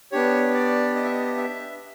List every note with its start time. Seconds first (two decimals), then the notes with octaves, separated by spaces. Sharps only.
0.12 B3 D4 G4 C#5
0.54 D5
0.95 D#5
1.04 E5
1.12 D#5
1.37 E5